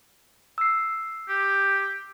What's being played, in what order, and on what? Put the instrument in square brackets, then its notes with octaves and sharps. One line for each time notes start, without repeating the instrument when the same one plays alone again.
[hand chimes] E6 C7
[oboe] G4